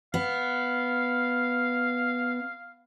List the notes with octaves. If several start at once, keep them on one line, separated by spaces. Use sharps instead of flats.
B3 F5